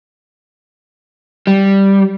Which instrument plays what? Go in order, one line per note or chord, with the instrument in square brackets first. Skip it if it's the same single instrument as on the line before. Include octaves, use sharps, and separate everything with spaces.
[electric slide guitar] G3